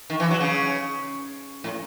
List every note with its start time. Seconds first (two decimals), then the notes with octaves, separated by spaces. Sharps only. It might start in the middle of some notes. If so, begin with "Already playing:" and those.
0.10 D#3
0.20 E3
0.31 F#3
0.40 C#3
1.64 A2